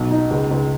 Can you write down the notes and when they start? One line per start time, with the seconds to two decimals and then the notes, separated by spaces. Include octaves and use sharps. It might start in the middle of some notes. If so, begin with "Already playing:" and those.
Already playing: B1
0.11 D#4
0.30 C#2
0.51 C#2